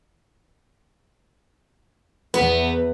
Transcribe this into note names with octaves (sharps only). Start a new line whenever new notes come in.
E2 B3 B4